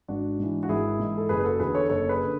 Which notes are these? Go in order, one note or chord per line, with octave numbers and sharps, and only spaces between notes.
G#1 D4 F#4
G#2 E3
F#4
G#1 E4 G#4
G#2 E3
A4
F#1 G#4 B4
B4
F#4 A4
E2 D3 G#4 B4
A4 C#5
F#1 A4 C#5
G#4 B4
D3